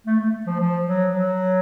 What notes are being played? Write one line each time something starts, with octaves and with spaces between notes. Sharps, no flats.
A3
A3
F3
F3
F#3
F#3